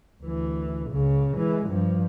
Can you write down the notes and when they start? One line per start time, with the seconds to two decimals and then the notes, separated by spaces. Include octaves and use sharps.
0.22 D2 E3
0.90 C#2 C#3
1.34 E3 G#3
1.67 G2 F3